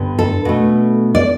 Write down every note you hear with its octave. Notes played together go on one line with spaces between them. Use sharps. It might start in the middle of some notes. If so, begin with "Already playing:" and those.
Already playing: G2 D3 B3
A4
B2 A3
D5